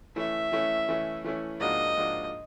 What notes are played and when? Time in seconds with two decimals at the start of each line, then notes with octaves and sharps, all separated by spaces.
0.16 E3 A3 C#4 E4 E5
0.52 E3 A3 C#4 E4
0.89 E3 A3 C#4 E4
1.24 E3 A3 C#4 E4
1.60 G#2 F3 A#3 D4 F#4 D#5
1.96 G#2 F3 A#3 D4 F#4